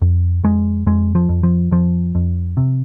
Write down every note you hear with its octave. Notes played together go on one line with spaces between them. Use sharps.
F2
F2 G#3
F2 G#3
F3
F2
F3
F2 F3
F2
C3